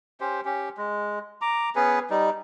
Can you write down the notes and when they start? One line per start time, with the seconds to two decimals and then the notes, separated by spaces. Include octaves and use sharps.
0.20 C#4 G4 C5
0.45 C#4 G4
0.78 G#3
1.41 A#5 D6
1.76 B3 C#4 G#4 B4
2.10 G3 D#4